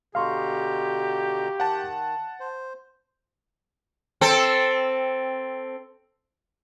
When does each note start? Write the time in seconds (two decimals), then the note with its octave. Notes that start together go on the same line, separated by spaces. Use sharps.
0.15 B2 D3 G4 F5 A#5 C6 C#6
1.60 D#3 F#5 A5
2.40 C5
4.21 C4 A4